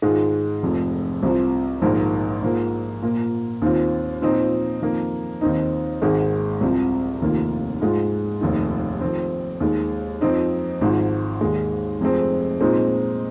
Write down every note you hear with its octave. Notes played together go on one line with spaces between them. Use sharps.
G#2 D#3 G#3 F4
F1 F2 C3
C2 C3 F3
A#1 G#2 D#3 A#3
G#2 F3 A#3
A#2 A#3 F4
D#2 D#3 C4 F4
A#2 F3 C4 D#4
F2 D#3 A#3
D#2 D#3 C4 D#4
G#1 G#2 D#3 G#3
C2 C3 F3
F1 D#2 D#3 A#3 F4
G#2 G#3 F4
F1 D#2 D#3
F2 D#3 C4
D#2 D#3 G#3
F2 F3 C4 D#4
G#1 G#2 F3
D#2 D#3 G#3
F1 F2 C3 G#3 C4
A#2 G#3 C4 D#4